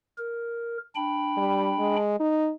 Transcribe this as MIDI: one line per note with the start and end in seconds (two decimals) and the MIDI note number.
0.18 0.77 70
0.95 1.96 62
0.95 1.96 79
0.95 1.96 83
1.37 1.73 55
1.79 2.19 56
2.20 2.51 63